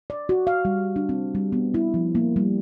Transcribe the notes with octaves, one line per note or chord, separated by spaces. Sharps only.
D5
F#4
F5
G3
D4
C4
G3
B3
E4
F3
A#3
G3